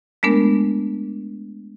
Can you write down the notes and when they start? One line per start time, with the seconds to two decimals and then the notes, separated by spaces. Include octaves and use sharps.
0.23 G#3 A3 B3 D4 A#4